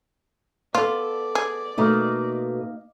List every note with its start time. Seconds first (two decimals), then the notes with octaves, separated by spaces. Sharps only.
0.75 B3 F4 A4 D5
1.35 G#4
1.78 B2 A3 A#3 D#4